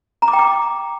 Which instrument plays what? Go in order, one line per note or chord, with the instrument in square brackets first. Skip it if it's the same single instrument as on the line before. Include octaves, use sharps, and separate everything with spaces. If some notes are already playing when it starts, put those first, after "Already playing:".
[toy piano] A#5
D6
G5
D6